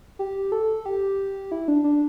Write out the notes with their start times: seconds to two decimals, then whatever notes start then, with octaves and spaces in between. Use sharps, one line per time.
0.19 G4
0.52 A4
0.86 G4
1.52 E4
1.68 D4
1.84 D4